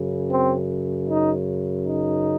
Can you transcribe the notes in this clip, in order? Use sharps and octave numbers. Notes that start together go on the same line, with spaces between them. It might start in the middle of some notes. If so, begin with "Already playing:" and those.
Already playing: F#2 C#3
C4
D#4
D#4